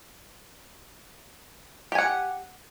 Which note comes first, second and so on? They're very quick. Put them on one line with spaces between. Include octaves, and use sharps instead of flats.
G4 G#5 F#5